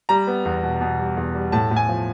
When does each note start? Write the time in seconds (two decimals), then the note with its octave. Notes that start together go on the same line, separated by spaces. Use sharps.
0.09 G3 A#5
0.27 B3
0.45 E2
0.63 B2
0.81 B2
0.99 G3
1.17 E2
1.35 G3
1.52 A2 A5
1.71 A2
1.76 G#5
1.89 F3